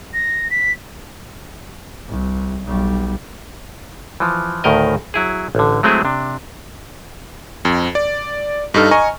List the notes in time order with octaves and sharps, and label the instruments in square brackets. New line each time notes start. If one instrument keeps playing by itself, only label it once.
[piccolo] A#6
B6
[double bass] C2
B1 G3
[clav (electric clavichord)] E3 F3
D2 A2 D#3 A#4 D#5
F#3 E4 G#4
A1 D3
F#3 G#3 A3 C4 E4 G#4
C3 D4
[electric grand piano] F2
D5
G2 D#4 A4 F6
D#5 G#5 A#5 C#6